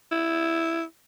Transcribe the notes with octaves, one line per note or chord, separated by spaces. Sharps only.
E4